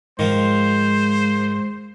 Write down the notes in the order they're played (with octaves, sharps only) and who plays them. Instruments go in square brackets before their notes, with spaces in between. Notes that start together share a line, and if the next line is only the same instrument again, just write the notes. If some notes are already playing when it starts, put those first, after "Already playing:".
[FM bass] G#2 [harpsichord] D#3 F3 [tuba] G#3 [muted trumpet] C5